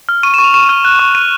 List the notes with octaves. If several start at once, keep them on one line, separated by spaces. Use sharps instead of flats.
F6
C#6 D#7
E7
C#6
F7
C#6 E7
F6
F#6
C#6
F#6 D#7